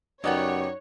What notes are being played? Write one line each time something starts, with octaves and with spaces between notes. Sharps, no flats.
F#2 C#3 B3 D#4 G4 C#5 D5 F#5